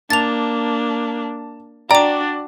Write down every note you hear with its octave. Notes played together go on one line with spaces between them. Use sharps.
A#3 D4 A5 A6 F7
D4 F#4 D5 G5 A#5 D6